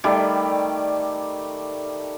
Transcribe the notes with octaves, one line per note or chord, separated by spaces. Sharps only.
D#3 G3 A3 D5